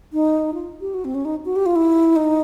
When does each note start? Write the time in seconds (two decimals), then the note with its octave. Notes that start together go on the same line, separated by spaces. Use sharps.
0.13 D#4
0.54 F4
0.81 G4
0.94 F#4
1.05 C4
1.15 C#4
1.25 D#4
1.45 F#4
1.56 G4
1.66 F4
1.76 E4
2.16 D#4